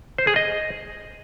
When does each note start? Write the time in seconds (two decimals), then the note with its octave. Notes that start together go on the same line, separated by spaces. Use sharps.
0.18 C5
0.27 G#4
0.36 D#5